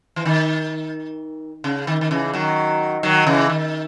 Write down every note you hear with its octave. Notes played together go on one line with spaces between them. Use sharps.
E3
D#3
C#3
D#3
D#3
C#3 E3
D#3 F#3
D#3 F#3
C#3 E3
D#3